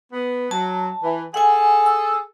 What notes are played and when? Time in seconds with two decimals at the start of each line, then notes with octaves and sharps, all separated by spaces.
0.13 B3
0.51 F#3 A5
1.03 E3
1.34 G#4 A4 F#5 G#5
1.86 E6